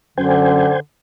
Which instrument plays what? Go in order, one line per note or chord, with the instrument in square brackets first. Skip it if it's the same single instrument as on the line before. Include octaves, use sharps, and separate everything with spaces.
[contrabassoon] F#2 [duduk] D3 [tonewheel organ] C5 G5 G#5